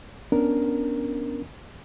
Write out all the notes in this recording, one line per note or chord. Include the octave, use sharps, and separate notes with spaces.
B3 C#4 D4 A#4